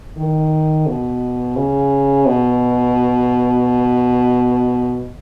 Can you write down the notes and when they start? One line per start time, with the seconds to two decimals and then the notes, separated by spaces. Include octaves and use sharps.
0.17 D#3
0.87 B2
1.56 C#3
2.26 B2